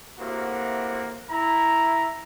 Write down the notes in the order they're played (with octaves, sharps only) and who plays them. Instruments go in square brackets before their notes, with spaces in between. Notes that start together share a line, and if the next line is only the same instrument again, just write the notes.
[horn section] A2 C3 A#3 F#4
E4 A#5